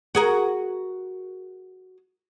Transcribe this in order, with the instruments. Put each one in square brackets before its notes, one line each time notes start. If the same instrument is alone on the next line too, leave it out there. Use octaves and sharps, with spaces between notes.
[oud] F#4 G#4 A#4